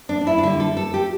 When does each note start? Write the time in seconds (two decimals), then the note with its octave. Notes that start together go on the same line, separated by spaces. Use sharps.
0.09 D4
0.21 D4
0.27 E4
0.38 D4
0.43 D3 G3 E4
0.60 A4
0.77 A4
0.94 G4